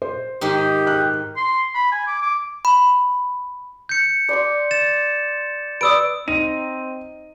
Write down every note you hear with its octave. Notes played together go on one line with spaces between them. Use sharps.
C5
G#2 D#3 D#4 G4
F6 F#6
C6
B5
G#5
D6
D6
B5
G6 C#7
D5 C6 D6
A6 E7
B4 D5 D#6 E6 D7
C4 D#4 D#7